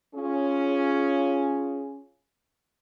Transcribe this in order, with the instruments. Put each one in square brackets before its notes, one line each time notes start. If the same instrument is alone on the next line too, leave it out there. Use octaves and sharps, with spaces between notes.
[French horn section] C#4 F4 G#4